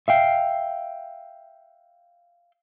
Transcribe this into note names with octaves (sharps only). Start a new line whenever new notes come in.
E5 F5 G5